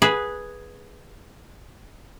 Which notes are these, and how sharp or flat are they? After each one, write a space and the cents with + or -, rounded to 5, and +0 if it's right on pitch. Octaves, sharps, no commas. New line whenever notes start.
G#4 +0 B4 -10 F#5 +0